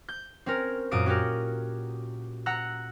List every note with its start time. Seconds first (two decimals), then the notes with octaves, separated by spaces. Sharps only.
0.09 G6
0.46 C4 C#4 A#4
0.91 F#2 A#2 D#6 D7
1.06 C#4 F#4 G4 A#4
2.46 F#5 A#5 E6 F#6